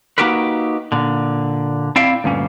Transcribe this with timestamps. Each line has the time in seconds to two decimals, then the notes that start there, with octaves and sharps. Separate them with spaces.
0.18 A#3 D#4 F#4 G4 A#4 B4
0.92 A#2 D3
1.96 C4 E4 D5 E5 F5 G5
2.24 D2 G2 A#2 C#4